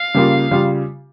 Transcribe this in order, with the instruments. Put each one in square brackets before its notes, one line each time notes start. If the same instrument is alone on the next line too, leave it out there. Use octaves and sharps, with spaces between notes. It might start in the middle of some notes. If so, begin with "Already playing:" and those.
Already playing: [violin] F5
[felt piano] C#3 G3 A#3 F4
C#3 G3 F4